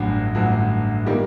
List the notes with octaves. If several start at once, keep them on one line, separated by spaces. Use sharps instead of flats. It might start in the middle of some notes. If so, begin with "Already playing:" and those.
Already playing: A1 G2 D3 F#3
A1 G2 D3 F#3
D#3 G3 A#3